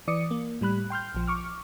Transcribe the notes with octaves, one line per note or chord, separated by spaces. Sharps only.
E3 D5 D6 D#6 C#7
A#3
A2 G3 B5 F#6
G5 C6 F6 G6
A#1 F3
C#6 D6 F6